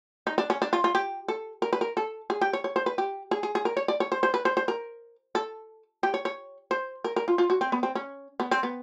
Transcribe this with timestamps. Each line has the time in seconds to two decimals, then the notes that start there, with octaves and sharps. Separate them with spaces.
0.27 D#4
0.38 D4
0.50 C#4
0.62 D4
0.73 F4
0.84 F4
0.95 G4
1.28 A4
1.62 A#4
1.73 B4
1.81 A#4
1.97 A4
2.30 G#4
2.41 G4
2.53 C#5
2.64 C#5
2.76 C5
2.86 B4
2.98 G4
3.31 G#4
3.43 G#4
3.55 G#4
3.65 A#4
3.77 C#5
3.88 D5
4.00 C#5
4.12 C5
4.23 C5
4.34 B4
4.45 C5
4.57 C5
4.68 A#4
5.35 A4
6.03 G4
6.14 C#5
6.25 C#5
6.71 C5
7.04 A#4
7.16 A#4
7.28 F4
7.38 F4
7.50 F#4
7.61 C4
7.72 B3
7.83 C4
7.95 C#4
8.40 B3
8.51 C4
8.63 B3